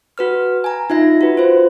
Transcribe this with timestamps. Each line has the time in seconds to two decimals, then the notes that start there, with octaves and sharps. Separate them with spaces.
0.18 F#4 B4 F6
0.64 G#5 A#5
0.90 D#4 F4 E5 A#6
1.21 F#4 B4
1.37 F4 C5